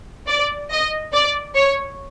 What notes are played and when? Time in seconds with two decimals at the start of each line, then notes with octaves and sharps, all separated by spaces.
0.29 D5
0.72 D#5
1.13 D5
1.56 C#5